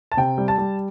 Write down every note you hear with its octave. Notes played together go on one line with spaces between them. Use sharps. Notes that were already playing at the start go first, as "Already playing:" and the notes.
A5
C3 G5
G3
A5
G3